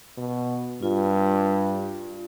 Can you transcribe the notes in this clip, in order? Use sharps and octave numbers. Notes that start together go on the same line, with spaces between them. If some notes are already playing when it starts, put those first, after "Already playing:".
B2
G2 F4